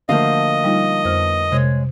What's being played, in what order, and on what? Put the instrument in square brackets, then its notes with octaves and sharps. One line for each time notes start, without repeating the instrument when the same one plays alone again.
[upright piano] D3 A3 A#3 [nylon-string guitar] F3 F#4 F5 [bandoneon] D#5
[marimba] G3 D#4 F4
[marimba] F2 C5 F6 [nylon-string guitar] B3
[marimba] C3 [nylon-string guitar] G#3 C#5